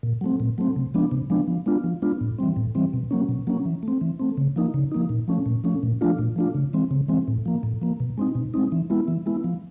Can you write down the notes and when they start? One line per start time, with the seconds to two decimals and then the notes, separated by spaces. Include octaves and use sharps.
0.03 A#2
0.21 F#3 A3 C4
0.40 A#2
0.58 F#3 A3 C4
0.76 C3
0.94 F3 G#3 B3 D4
1.11 C3
1.30 F3 G#3 B3 D4
1.48 F3
1.66 G#3 B3 D4 F4
1.84 F3
2.02 G#3 B3 D4 F4
2.21 A2
2.38 E3 G3 C4
2.56 A2
2.75 E3 G3 C4
2.93 B2
3.11 F#3 A#3 C#4
3.29 B2
3.47 F#3 A#3 C#4
3.65 E3
3.83 A3
3.88 C4
4.01 E3
4.19 A3 C4
4.37 C#3
4.56 F3 A#3 D#4
4.74 C#3
4.92 F3 A#3 D#4
5.09 A#2
5.28 F3 A3 C#4
5.46 A#2
5.64 F3 A3 C#4
5.83 A#2
6.01 F3 A3 D4 F4
6.19 A#2
6.36 F3 A3 D4 F4
6.54 C#3
6.73 E3 G#3 C4
6.91 C#3
7.08 E3 G#3 C4
7.28 A2
7.46 F3 A#3
7.63 A2
7.82 F3 A#3
8.00 B2
8.18 G#3 C4 D#4
8.35 B2
8.54 G#3 C4 D#4
8.72 E3
8.90 G#3 B3 E4
9.08 E3
9.26 G#3 B3 E4
9.44 F3